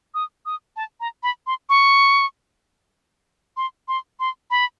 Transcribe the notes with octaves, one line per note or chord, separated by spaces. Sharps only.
D#6
D#6
A5
A#5
B5
C6
C#6
C6
C6
C6
B5